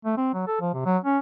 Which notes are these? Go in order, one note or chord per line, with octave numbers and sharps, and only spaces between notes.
A3
C4
F#3
A4
F3
C3
F#3
C#4